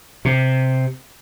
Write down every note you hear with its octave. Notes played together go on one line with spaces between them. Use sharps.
C3